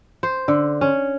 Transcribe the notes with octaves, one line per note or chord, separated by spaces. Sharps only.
C5
D3
C#4